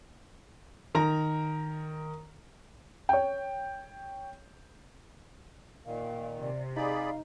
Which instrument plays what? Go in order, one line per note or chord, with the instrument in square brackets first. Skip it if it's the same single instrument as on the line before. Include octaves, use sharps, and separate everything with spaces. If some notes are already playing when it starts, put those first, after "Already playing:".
[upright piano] D#3 A#4 A#5
[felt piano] C#5 G5
[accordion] A#2 D#3 [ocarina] F5
[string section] C3 [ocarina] D5
[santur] D#4 [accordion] G#4 D5 B5 [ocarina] F5